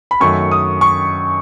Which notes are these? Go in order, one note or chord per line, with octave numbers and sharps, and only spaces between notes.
B5
F#2 D#3 A3 C#6
D#6
C#6